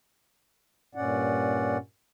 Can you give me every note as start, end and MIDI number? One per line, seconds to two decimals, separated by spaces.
0.95 1.78 43
0.95 1.78 46
0.95 1.78 61
0.95 1.78 74
0.95 1.78 78